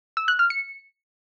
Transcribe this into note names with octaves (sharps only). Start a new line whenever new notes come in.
E6
F#6
F6
C#7